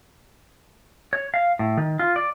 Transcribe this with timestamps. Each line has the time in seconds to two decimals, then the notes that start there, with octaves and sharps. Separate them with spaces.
1.13 C#5
1.34 F5
1.59 A2
1.77 D#3
1.99 F4
2.16 D5